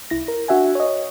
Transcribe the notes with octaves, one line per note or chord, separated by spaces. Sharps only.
C2 E4 A#6
A#4
D4 F#4 E5 F#5 G#5
C#5 D#5